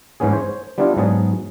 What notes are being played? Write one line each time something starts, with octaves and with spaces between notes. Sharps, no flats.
G#2 E3 B3 C#4 G#4
C5 C#5
G3 B3 D4 E4 F4
G#2 F#3 B3 G#4 A5